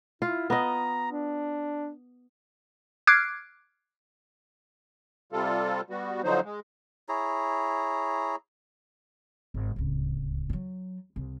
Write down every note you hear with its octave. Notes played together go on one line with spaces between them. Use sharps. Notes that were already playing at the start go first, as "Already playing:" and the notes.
E4 F4
B3 D#5 A#5
D4
D6 F6 F#6 G#6 C7 D7
C3 G3 F4 A4
G3 B3 F#4
D3 F3 F#3 D#4 C5
G#3
E4 G#4 C#5 A#5
G#1
D1 C#2
F#3 G3
C2